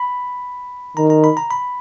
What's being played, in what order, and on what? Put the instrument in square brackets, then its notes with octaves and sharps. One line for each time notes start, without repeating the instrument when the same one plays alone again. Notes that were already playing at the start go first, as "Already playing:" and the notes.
Already playing: [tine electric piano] B5
[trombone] D#3 [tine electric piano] A#5
[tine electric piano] A#5
B5
A#5
B5